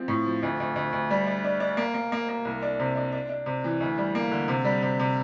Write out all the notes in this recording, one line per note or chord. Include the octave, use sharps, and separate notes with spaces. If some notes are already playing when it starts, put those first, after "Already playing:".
Already playing: F3 C4
A2
F3
D2
D2
D2
D2
G3
D4
D4
D4
A#3
A#3
A#3
A#3
C2
D4
C3
D4
D4
D4
C3
E3
D2
G3
A#3
D3
C3
G3
C3
C3